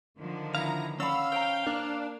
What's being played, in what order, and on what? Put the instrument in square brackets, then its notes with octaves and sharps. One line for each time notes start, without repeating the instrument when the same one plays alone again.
[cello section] D3 D#3 F3
[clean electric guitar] B3 E4 F5 [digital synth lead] A#5
[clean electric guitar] C#4 [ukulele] D5 F#5 B5 [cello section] F5 [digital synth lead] E6
[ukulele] C5 A#5 [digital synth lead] G5
[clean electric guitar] A#3 [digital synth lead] D4